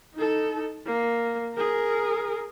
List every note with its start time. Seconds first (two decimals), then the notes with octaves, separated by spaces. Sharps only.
0.15 D#4 A4
0.86 A#3
1.54 G#4 A#4